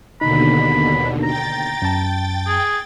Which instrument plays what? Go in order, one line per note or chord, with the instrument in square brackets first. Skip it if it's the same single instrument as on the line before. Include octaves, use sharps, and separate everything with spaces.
[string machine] D#2 B2 D3 [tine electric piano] D#4 [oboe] B5
[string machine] G5 A6 [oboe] A#5
[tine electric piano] F#2 A5
[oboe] G#4